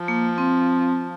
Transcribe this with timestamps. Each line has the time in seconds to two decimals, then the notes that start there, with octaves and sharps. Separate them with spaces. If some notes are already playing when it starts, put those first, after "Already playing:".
Already playing: F3
0.08 A#3
0.38 C4